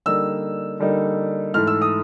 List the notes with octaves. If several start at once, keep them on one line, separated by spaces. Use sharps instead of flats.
D3 G3 A#3 D#4 E6
D3 G3 A#3 D#4
G#2 E3 A3 F6
E6
D#6